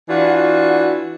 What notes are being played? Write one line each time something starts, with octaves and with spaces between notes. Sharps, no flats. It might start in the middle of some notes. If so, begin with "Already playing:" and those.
E3 D4 F4 F#4